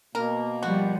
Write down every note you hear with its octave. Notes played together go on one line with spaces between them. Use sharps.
B2 A#3 A#4
F3 G3 F#4